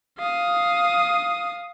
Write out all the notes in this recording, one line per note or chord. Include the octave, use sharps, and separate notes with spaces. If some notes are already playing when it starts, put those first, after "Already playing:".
F5 D#6